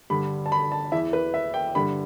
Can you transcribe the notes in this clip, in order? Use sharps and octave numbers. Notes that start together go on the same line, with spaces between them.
G2 D3 B5
A5
B5
A5
E2 E3 E5
B4
E5
G5
G2 D3 B5